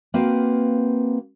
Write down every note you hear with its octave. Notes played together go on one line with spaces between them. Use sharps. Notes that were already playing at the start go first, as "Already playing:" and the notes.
A#3 C4 F#4 B4 F5